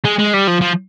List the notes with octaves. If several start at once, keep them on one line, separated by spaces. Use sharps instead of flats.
G#3
G#3
G3
F3
F3